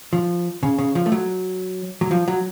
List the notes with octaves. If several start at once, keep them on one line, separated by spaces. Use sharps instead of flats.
F3
C#3
C#3
F3
A3
F#3
F#3
F3
F#3